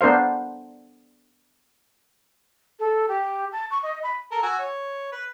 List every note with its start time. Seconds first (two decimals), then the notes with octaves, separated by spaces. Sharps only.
0.01 B3 D4 A#4 C5 F5
2.79 A4
3.08 G4
3.52 A5
3.70 C#6
3.83 D#5
4.03 B5
4.31 A4 A#4
4.43 F#4 G#5 E6
4.59 C#5
5.12 B4